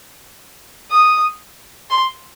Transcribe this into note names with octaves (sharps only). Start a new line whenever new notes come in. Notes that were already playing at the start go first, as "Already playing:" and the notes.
D#6
C6